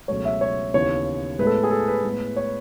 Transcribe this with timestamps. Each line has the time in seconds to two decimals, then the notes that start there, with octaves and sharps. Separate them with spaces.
0.08 C#2 B2 F#3 A3 C#5
0.25 E5
0.41 C#5
0.74 D#2 C#3 E3 B3 C#5
1.39 A2 G#3 B3 B4
1.47 A4
1.64 G#4
1.71 A4
1.88 B4
2.05 A2 G#3 B3
2.37 C#5